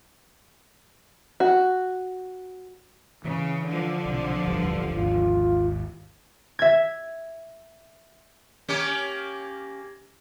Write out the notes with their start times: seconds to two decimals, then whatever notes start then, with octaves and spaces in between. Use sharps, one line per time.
1.40 F#4
3.24 C#3 E3
3.68 D3 F3
4.06 B1 C3
4.45 D#1 A1 D2 G2
4.95 G#1 D#2 G#2 F4
6.59 E5 G#6
8.68 A#3 C#4 G4